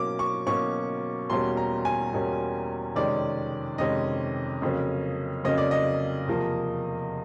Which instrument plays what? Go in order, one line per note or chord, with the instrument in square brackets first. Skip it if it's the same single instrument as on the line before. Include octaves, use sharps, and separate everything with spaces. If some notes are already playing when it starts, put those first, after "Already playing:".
Already playing: [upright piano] B2 F#3 A#3 C#4 D6
C#6
B2 F#3 A#3 C#4 C#6
E2 B2 G3 A#3 C#4 C6
A#5
G#5
E2 B2 G3 A#3 C#4
F2 C3 D#3 G#3 C#4 D5
F2 C3 D#3 G#3 C#4 D#5
F2 C#3 F#3 A#3 C#4
F2 C#3 F#3 A#3 C#4 D#5
D5
D#5
E2 C3 F3 A#3